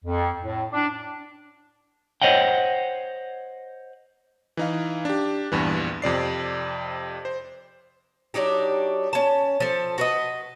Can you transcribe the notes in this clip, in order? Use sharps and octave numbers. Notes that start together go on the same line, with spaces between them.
F2
A2
D4
C5 C#5 D#5 F#5 G5
E3 D#4 F5
D4 G4
A#1 E2 G2 E3
F2 C3 D5 C7
C5
F#3 D4 D#4 G4
C#4 A5
F3 A4
F#4 B4 D#5